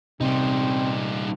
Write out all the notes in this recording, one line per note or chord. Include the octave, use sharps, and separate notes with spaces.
C3 G3 C4 D#4